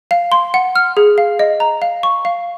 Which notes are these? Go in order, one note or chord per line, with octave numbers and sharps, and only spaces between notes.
F5
C6
F#5
F6
G#4
F5
D#5
A#5
F5
C#6
F5